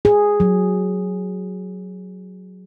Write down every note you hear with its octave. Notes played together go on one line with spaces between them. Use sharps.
G#4
F#3